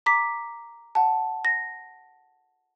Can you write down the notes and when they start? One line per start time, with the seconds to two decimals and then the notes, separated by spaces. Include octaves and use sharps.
0.06 A#5 D6 B6
0.95 F#5 A5
1.45 A#6